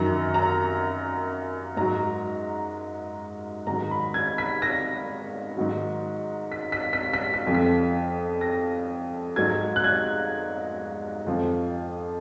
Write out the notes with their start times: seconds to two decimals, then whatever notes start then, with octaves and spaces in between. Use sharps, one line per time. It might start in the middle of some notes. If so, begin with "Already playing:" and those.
Already playing: F#2 D#3 F#3 A#5
0.34 A#5
1.77 G#2 F#3 A#5
3.67 G#2 D#3 F#3 A#5
3.91 B5
4.14 G#6
4.38 B6
4.62 A#6
5.57 G#2 D#3 F#3
6.52 B6
6.72 B6
6.93 B6
7.13 B6
7.34 B6
7.47 F2 F3
7.54 B6
8.41 A#6
9.36 G#2 F#3 G#6
9.76 F#6
9.84 G#6
11.26 F2 F3